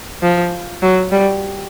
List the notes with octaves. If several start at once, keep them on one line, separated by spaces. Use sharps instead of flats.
F3
F#3
G3